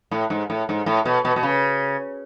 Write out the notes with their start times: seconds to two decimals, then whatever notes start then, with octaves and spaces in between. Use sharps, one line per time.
0.11 A2
0.30 G#2
0.50 A2
0.69 G#2
0.86 A2
1.05 B2
1.25 B2
1.36 B2
1.43 C#3